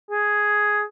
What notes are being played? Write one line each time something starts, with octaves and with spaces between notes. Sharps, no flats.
G#4